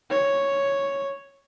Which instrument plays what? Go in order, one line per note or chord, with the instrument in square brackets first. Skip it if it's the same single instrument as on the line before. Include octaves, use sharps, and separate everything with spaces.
[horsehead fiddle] C#5